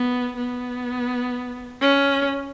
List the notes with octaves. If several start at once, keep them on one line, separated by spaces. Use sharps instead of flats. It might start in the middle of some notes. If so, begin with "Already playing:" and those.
Already playing: B3
B3
C#4